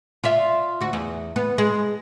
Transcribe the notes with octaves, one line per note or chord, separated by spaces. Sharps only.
F4 D5 E5
D2 F#4
E2
B3
G#3